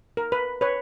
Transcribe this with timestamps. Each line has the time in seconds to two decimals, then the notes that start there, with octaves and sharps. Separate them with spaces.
0.17 A#4
0.32 B4
0.61 B4 C#5